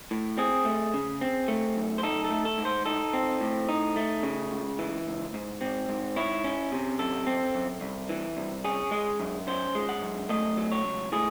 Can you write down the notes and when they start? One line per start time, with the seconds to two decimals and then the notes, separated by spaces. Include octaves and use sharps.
0.11 A2
0.38 C4 G#4
0.65 A3
0.94 C#3
1.21 C4
1.48 A3
1.76 F#2
1.98 C5
2.03 D#4 A4
2.24 A4
2.30 A3
2.45 A4
2.58 G#2
2.65 C5
2.86 D#4 A4
3.13 C4
3.41 A2
3.69 D#4
3.96 A3
4.23 C#3
4.51 C#2
4.79 E3
5.07 C#2
5.34 G#2
5.61 C4
5.89 G#2
6.16 E4 C#5
6.44 C#4
6.72 C3
6.99 F#2 A4
7.27 C4
7.55 F#2
7.81 C2
8.09 E3
8.37 C2
8.64 C#4 G#4
8.91 G#3
9.20 F#2
9.47 C#4 C5
9.75 G#3
9.89 F#5
10.02 F#2
10.29 A3 D#5
10.57 F#3
10.72 C#5
10.84 C#2
11.12 A2 G#4